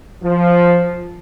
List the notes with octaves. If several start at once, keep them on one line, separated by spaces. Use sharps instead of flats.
F3